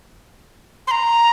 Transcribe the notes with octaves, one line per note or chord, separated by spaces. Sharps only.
C6
A#5